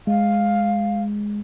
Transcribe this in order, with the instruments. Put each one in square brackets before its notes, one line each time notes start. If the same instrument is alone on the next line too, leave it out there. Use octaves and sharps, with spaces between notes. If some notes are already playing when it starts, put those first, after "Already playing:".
[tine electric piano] G#3 [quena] F5